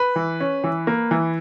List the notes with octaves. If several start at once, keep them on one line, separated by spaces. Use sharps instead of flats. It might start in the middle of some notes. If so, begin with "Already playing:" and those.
Already playing: B4
E3
C#4
E3
A#3
E3